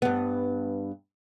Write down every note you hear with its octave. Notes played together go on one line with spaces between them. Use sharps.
G2 B3